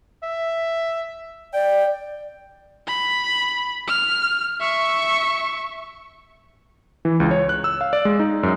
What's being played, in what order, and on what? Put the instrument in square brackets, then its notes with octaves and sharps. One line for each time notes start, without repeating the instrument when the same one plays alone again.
[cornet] E5
[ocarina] D5 [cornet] G5
[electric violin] B5
F6
E5 C#6
[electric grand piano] E3
C#2
C#5
F#6
E6
F5
D5
G#3
D#4
F#2